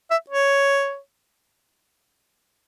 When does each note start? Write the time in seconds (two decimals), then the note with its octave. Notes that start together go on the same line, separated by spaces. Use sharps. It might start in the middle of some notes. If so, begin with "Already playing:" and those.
0.11 E5
0.30 C#5